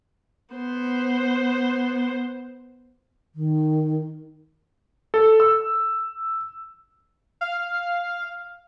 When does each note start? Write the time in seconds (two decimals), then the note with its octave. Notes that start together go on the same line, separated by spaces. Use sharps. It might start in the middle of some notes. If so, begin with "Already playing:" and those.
0.54 B3 C5
3.34 D#3
5.14 A4
5.40 E6
7.41 F5